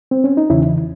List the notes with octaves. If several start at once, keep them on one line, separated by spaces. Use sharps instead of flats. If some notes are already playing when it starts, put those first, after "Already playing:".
C4
C#4
D#4
E2 C#3 E3 C#4 E4